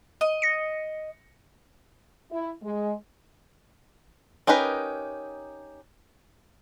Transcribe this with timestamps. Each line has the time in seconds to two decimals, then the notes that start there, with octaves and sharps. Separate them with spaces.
0.21 D#5
0.42 A#6 C#7
2.31 E4
2.63 G#3
4.47 C#4 D#4 G4 A#4 B4